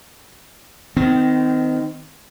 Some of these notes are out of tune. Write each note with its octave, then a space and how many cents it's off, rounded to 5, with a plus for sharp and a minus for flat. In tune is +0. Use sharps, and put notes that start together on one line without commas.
D#3 +0 C4 -35